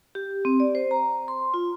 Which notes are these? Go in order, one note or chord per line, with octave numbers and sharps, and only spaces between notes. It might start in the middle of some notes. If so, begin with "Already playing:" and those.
G4
C4
D5
C5
A#5
C6
F4